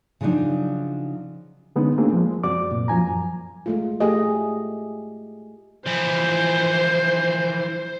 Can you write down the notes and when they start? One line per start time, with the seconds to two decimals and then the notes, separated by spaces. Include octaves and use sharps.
0.21 C#3 F3 F#3 D4 D#4
1.76 D3 G#3 B3 C#4 D#4
1.98 A3 A#3 C4 D4 F#4 G#4
2.13 F3 G#3
2.44 F#2 C4 F#4 D5 D6
2.72 A#2
2.88 F#2 F3 G#5 A#5
3.66 G#3 A3 F4
4.00 A3 G4 G#4 D#5
5.86 E3 F3 C5